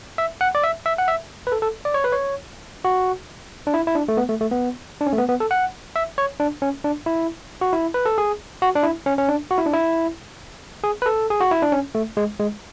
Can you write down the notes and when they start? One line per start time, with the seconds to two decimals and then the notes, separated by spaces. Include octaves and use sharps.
0.18 E5
0.41 F#5
0.55 D5
0.64 E5
0.86 E5
0.98 F#5
1.08 E5
1.47 B4
1.52 A4
1.62 A4
1.85 D5
1.94 C#5
2.04 B4
2.12 C#5
2.85 F#4
3.67 D4
3.74 E4
3.87 E4
3.95 D4
4.08 A3
4.17 B3
4.29 A3
4.41 A3
4.51 B3
5.01 D4
5.07 C#4
5.13 A3
5.18 B3
5.29 B3
5.40 A4
5.51 F#5
5.96 E5
6.18 C#5
6.40 D4
6.62 C#4
6.84 D4
7.06 E4
7.61 F#4
7.73 E4
7.94 B4
8.06 A4
8.18 G#4
8.62 F#4
8.76 D4
8.83 E4
9.06 C#4
9.18 C#4
9.28 D4
9.51 F#4
9.58 E4
9.66 D4
9.73 E4
10.84 G#4
11.02 B4
11.06 A4
11.30 G#4
11.40 F#4
11.51 E4
11.62 D4
11.72 C#4
11.95 A3
12.17 G#3
12.40 G#3